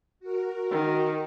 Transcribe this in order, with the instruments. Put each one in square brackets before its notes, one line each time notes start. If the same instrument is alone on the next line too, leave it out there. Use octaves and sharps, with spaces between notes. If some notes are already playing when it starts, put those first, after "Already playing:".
[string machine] F#4 A#4
[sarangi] D#3